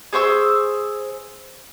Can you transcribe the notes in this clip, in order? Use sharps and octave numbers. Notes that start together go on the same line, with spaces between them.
G#4 C5 C#6 E6